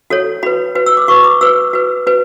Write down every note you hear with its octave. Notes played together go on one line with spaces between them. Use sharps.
F#4 A4 C#5
F#4 B4 B5
F#4 B4
E6
D6
F#4 B4 C#6
D6
F#4 B4 E6
F#4 B4
F#4 B4